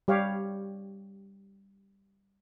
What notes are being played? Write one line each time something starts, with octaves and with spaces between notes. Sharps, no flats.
G3 G4 C#5 F5